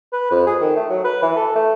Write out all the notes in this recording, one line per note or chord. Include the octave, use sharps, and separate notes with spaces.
B4
F2
G#4
D#3
A3
F#3
B4
E3
A4
A3